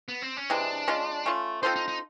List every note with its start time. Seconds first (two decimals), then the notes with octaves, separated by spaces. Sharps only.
0.08 B3
0.22 C4
0.37 C#4
0.50 C3 E3 G#3 D4
0.88 G#3 C#4 F4
1.26 A3 C#4 F4
1.63 C4 D#4 F4 A4 C5
1.76 D#4
1.88 D#4